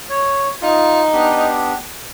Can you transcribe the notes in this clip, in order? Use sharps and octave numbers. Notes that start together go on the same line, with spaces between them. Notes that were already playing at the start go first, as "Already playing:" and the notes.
C#5
D#4 F4
B3 D4 G4